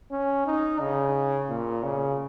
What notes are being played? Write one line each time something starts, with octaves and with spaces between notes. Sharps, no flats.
C#4
D#4
C#3
A#2
C#3